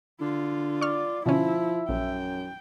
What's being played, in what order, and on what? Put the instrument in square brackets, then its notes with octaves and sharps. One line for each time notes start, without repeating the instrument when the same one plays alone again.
[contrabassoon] D3 [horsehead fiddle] F4
[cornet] D5 [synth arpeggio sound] C#6 F6
[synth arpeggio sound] B2 D3 C#4 [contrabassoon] F3 [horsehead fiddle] E4 [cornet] E5
[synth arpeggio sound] A#1 [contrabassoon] F#2 [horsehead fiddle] G5